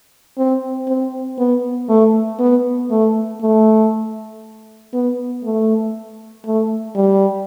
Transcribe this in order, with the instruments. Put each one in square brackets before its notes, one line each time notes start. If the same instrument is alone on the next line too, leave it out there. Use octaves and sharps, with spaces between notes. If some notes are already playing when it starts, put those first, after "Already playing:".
[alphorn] C4
C4
B3
A3
B3
A3
A3
B3
A3
A3
G3